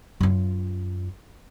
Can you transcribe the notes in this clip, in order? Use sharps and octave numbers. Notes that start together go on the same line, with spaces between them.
F#2 F4